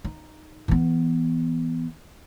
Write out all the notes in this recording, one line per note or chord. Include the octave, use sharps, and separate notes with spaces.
D#4
E3 B3